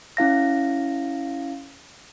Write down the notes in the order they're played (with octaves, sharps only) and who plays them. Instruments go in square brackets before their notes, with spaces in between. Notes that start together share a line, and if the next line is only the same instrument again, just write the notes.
[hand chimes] C#4 E4 F5 A#6